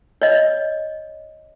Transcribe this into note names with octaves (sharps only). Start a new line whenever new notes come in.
C#5 D#5